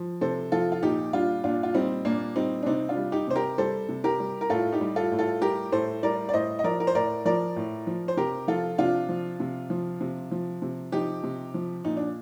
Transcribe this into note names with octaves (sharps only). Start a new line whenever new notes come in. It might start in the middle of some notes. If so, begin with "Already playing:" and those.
Already playing: F3
C3 A4 C5
F3 F4 A4
F4
A#2 D#4 G4
G3 D4 F4
A#2 D4 F4
F4
G3 C4 D#4
A#2 A#3 D4
G3 C4 D#4
D4
C3 C4 D#4
D4 F4
G3
D#4 G4
C3 C5
G4 A#4
G3 A4 C5
C3
G4 A#4
G3
A#4
A2 F4 A4
D#4 G4
G3
F4 A4
A2
F4 A4
G3 G4 A#4
A2 A4 C5
G3 A#4 D5
D5
A2 C5 D#5
D#5
F3 A#4 D5
A#4
C5
A2 A#4 D5
F3 A#4 D5
A2
F3
C5
C3 G4 A#4
F3 F4 A4
C3 D4 F4
F3
C3
F3
C3
F3
C3
F3 D#4 G4
C3
F3
A#2 D#4
D4